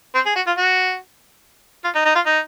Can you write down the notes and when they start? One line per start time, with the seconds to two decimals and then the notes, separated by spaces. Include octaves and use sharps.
0.15 C4
0.26 G#4
0.36 F#4
0.47 F4
0.57 F#4
1.84 F4
1.95 D#4
2.05 D#4
2.15 F4
2.26 D#4